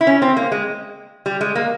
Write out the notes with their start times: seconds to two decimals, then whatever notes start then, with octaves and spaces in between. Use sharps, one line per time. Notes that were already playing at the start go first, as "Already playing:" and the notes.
0.01 E4
0.07 C#4
0.22 C4
0.37 A#3
0.52 G#3
1.26 G3
1.41 G#3
1.55 A#3